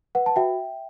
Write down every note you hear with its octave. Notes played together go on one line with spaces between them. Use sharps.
B4 F#5
A5
F#4 E5 G5